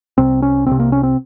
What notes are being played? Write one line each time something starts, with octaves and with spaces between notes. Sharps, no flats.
C2 C3 C4
C#4
C2 C3 C4
A#3
C#4
C4